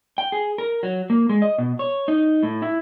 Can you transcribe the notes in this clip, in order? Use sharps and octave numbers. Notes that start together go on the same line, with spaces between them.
G5
G#4
A#4
F#3
A#3
G#3
D#5
B2
C#5
D#4
A2
E4